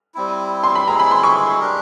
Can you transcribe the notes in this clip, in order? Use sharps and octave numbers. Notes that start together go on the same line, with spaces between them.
G3 C4 E4
C6
B5
G#3 C4 E4 G#4 A#5
B5
C6
C#6
D4 G4 A#4